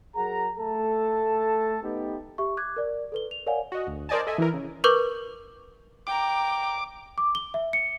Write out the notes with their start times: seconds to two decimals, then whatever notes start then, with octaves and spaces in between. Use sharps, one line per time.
0.16 F#3 G#4 A#4 F#5 A#5
0.58 A3 A4 A5
1.83 A3 B3 D#4 G4
2.38 G4 E5 C#6
2.57 D6 F#6 G#6
2.77 A#4 D5
3.12 A4 B4 G7
3.31 F7
3.47 A#4 C#5 D5 F5 F#5 G#5
3.72 F#4 D#5
3.87 D2
4.09 A#4 C5 D5 D#5 G#5 A5
4.27 A4 D#5 E5 G#5
4.38 E3 E4 A#4
4.54 C#3
4.84 A#4 B4 C#6 D6 G6
6.07 G5 A#5 D6
7.18 D6
7.35 G7
7.54 E5
7.73 C#7